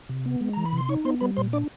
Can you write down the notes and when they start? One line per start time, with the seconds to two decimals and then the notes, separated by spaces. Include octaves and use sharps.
0.09 C3
0.26 B3
0.41 G#3
0.53 E3 A#5
0.66 B5
0.73 C3 C6
0.89 D#4 C#5 C#6
1.05 B3 C5 C6
1.21 G3 B4 B5
1.37 A#2 C5 C6
1.53 D4 D5 D6